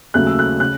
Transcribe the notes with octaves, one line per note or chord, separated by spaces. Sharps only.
D#2 C#3 F#3 A3 F#6
E6
F#6
C#3 F#6